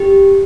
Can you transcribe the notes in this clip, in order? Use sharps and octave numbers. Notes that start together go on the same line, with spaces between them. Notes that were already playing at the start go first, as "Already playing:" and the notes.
Already playing: G4